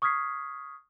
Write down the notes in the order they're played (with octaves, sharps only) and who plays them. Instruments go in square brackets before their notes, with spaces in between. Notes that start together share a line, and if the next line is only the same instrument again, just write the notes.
[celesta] C#6 D#6 F6 G#6 B6 C7